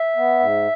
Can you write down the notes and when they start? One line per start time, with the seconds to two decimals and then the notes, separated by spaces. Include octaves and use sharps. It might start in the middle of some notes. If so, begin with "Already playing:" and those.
Already playing: E5
0.17 B3
0.40 G#2